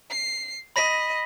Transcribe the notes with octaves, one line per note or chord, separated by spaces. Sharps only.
C7
D#5 B5 A#6 B6